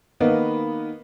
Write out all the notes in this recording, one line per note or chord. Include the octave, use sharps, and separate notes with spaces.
D#3 A#3 B3 A#4 B4 D#5